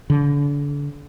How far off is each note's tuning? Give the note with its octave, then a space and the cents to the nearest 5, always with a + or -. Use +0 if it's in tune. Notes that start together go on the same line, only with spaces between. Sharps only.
D3 -35